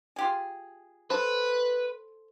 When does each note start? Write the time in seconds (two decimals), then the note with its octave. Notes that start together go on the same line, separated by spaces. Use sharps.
0.16 F4 G4 G#4
1.10 A4 B4 C5